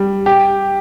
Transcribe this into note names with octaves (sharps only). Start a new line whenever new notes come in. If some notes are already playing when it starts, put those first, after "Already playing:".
Already playing: G3
G4